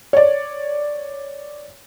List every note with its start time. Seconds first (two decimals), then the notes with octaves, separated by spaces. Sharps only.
0.13 C#5 D5